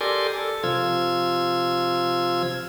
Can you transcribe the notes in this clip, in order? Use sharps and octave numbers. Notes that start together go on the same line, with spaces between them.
G4 A4 A#4 D5 G#5 C6
A4
C3 F3 F4 E6 G#6